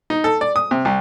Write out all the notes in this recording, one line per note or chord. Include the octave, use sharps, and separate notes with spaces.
D#4
A4
D5
D#6
C3
C2